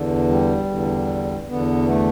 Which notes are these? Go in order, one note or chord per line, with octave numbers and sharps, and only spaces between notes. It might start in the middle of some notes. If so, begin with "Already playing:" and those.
Already playing: E2 D3
G3
E2 D3
E2 D3 B3
A3